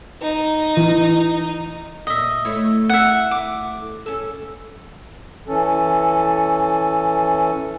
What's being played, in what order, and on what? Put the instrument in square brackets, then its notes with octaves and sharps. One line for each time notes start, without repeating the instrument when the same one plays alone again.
[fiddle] D#4
[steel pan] E3
[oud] A#2 [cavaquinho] D#5 E5
[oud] A3 E4 C#5
[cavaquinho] E5 F#5
D6
[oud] C#4 A4
[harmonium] E3 C#4 A4